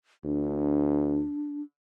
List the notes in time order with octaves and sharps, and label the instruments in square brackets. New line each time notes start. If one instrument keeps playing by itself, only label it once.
[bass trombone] D2 [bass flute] D4